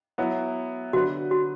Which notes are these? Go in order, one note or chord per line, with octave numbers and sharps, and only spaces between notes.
F#3 B3 E4
D3 F#3 D4 F#4 B4
F#4